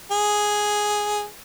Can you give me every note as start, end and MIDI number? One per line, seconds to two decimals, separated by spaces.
0.11 1.24 68